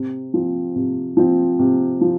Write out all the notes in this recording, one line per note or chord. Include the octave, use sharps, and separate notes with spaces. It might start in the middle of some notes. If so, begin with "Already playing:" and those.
Already playing: C3
F3 C4
C3
F3 C4
C3
F3